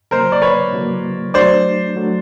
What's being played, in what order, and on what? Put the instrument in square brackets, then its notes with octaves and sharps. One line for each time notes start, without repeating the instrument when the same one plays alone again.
[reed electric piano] C#3 F#3 A#3 [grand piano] A#4 C5
[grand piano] D5
B4 C#5
[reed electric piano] C#3 F#3 A#3
[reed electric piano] F#3 A3 D4 [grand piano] C5 D5
[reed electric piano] F#3 A3 D4